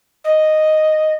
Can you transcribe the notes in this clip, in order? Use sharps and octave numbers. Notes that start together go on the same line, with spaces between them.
D#5